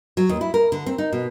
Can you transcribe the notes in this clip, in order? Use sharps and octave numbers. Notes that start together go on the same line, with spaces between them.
F#3
D#2
E4
A#4
D3
C4
D#4
B2